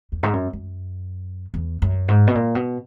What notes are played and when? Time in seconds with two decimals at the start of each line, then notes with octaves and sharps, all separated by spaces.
0.12 E2
0.23 G#2
0.33 F#2
0.53 F#2
1.54 E2
1.82 F#2
2.08 G#2
2.27 B2
2.35 A#2
2.55 B2